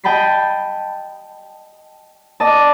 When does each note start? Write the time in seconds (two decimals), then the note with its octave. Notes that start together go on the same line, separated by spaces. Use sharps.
0.04 D#5 G5 A5 B5 B6 C7
2.40 D5 D#5 A5